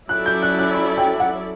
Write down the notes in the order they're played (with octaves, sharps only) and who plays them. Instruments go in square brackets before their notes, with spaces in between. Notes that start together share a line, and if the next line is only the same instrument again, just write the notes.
[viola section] F#3 C#4 E4 A4 D5 [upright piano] F#6
[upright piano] G6
F#6
F#6
B5
G5
F#5